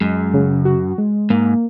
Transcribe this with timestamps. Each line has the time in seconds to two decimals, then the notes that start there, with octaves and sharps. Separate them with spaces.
0.01 F#2 G#3
0.34 C#3
0.65 F#4
0.98 G#3
1.30 G#2 A#3